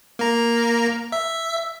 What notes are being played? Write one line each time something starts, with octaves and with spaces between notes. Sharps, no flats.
A#3 A#5
E5